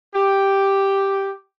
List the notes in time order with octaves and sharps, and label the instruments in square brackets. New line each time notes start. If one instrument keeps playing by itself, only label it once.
[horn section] G4